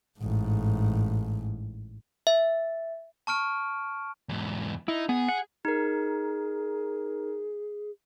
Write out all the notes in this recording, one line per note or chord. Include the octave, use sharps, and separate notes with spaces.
A1 G#2
E5
A5 C#6 F6 D7
E2 G#2
D#4 E4
B3 G#4
F#5
D#4 G#4 A#4